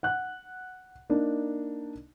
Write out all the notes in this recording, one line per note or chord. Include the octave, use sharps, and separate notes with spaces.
F#5 F#6
A#3 D4 D#4